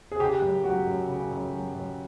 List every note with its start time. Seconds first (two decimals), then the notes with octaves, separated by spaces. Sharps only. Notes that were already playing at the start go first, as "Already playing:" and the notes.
0.12 G#4
0.20 C#3 G4
0.42 F#2
0.64 F#3 F#4
0.87 F#2
1.08 C#3
1.31 F#2
1.53 F#3
1.75 F#2